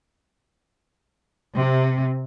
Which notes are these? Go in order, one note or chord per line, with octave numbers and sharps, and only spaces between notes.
C3